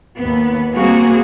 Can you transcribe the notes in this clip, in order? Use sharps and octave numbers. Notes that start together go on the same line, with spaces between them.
D#2 B3
G3 A#3 C4 F#4 G#4